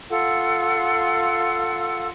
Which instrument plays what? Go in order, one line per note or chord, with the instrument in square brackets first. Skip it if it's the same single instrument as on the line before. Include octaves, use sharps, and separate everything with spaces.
[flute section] F4 A4 F#5